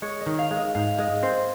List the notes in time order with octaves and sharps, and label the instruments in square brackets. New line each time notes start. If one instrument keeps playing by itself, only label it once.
[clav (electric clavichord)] G#3 [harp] C#5
[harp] D#5
[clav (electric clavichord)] D#3
[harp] F5
[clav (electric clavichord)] G#3
[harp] D#5
[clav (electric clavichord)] G#2 [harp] F5
[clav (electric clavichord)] G#3 [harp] D#5
[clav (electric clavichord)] C4 [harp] C5